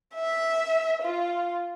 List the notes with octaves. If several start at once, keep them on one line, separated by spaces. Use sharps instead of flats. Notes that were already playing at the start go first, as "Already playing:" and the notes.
E5
F4